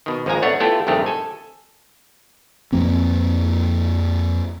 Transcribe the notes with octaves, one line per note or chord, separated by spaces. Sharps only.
B2 D#3
G#1 F3 G#3 A#3 G#5 A#5
A3 B3 D4 C#5 F#5
A3 B3 E4 F4 G4 A4
A#1 G2 C3 D#3 A3 G4
A4 G#5
F2 F3 A#3 C4